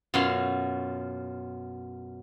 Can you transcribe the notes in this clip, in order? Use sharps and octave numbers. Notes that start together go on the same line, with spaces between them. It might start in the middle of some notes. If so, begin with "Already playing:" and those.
F#2 B2 F4 C#5 F#5 C6